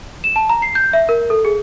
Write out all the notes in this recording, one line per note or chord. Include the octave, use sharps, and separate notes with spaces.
E7
A5
A#5
C7
G6
E5
A#4
A4
G#4